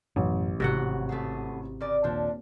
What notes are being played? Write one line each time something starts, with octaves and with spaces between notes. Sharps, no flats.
A1 F#2 B2 F#3
G#1 C3 F#4 F#5
A3 B3 G#4
C#3 A#4 D5
D#1 F3 D4